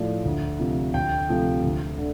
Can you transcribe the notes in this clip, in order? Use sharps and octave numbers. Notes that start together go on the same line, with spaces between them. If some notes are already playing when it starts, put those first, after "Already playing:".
Already playing: A2 F3 A3 D5
D2
C3 F3 A3
D2 G5
C3 F3 A3
D2
D3